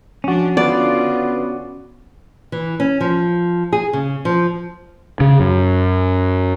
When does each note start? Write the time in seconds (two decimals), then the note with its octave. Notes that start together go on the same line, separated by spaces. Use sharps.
0.24 F3 C#4 D4 F#4
0.57 D3 B3 F4 D5
2.52 E3
2.80 C#4
3.01 F3
3.73 G#4
3.93 C#3
4.25 F3
5.20 C#3
5.40 F#2